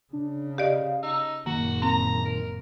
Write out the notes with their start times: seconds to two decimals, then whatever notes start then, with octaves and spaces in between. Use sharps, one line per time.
0.13 C#3 D4
0.58 G4 D5 D#5 F5
1.03 D#4 E6
1.46 F#1 A#2 D#3 A#3 F#4
1.82 C4 A#5
2.25 A#4